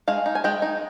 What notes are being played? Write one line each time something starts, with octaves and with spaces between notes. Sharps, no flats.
G#3 F5 G#5
D#4
G#5
G#3 D#5 G5
D#4